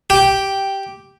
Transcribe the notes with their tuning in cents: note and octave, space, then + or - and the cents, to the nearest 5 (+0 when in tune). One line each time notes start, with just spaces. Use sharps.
G4 -5 G5 +0